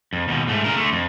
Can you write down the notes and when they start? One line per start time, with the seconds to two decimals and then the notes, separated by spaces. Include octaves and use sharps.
0.13 F2
0.28 D#2 B2
0.48 G#2 A3
0.64 C#3 A#4
0.77 D3 A3
0.93 F2